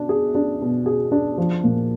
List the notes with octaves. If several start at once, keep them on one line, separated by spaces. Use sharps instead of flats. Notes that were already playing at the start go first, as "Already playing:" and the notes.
Already playing: B2 D4
G#4
D4
B2
G#4
D4
F3
A#2